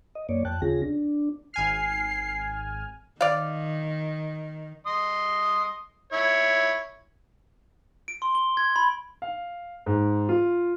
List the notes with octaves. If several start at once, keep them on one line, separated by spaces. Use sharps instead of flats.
D#5
F#2 A#3 C#5 D5
F2 G5 A5 F#6
D#2 C#3 C#4 F4 G#4 A#6
D4
G#1 G#5 F6 C7
D#3 D5 F5
D#5 C6 D#6
E4 C#5
D7
C6
G7
G#6
B5
F5
G#2
F4